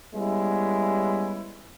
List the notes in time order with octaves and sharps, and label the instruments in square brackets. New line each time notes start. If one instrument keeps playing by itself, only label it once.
[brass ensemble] G3 G#3 B3 C#4 E4